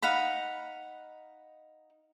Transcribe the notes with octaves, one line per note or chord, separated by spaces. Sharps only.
D#4 F5 F#5 B5